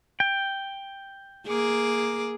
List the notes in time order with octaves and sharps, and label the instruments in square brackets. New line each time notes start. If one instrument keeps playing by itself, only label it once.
[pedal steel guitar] G5
[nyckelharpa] A#3 D6 [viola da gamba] G#4